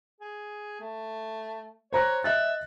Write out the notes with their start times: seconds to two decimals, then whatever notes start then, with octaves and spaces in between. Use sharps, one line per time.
0.21 G#4
0.80 A3
1.93 C5 C#5 A#5 F#6
2.24 D#5 E5 F#6 A6